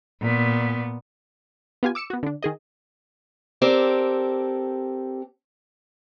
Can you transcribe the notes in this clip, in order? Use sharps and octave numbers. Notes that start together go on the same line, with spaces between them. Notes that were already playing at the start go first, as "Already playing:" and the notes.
A#2 B3
B3 F4 G4 G#5
D6 E6 C#7 E7
B3 F#4
D3 D4
D#3 G#4 D#5
C4 G4 A4 A#4 D5